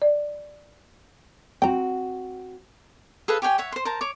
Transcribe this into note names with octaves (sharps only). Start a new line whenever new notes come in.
D5
C4 F#4 G5 A#5
G#4 A4 B4 F5
G4 C#5 G5 G#5
C#5 E5 F#5
C5 C6
A#4 C5 A5 A#5
C#5 D6